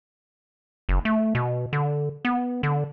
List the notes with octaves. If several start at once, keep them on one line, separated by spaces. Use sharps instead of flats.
F#1
A3
B2
D3
B3
D3